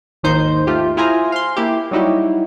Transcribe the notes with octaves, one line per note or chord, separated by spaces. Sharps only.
G#1 D#2 D#3 D#4 C5 G6
A3 F4 G4
E4 F4 G#4 C5 G#5 A#5
F5 C6
A#3 E4 G4
F#3 G3 D#4 E4 F#4 G4